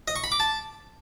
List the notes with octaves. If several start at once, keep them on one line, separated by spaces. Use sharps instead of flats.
D#5
C#6
B5
D6
A5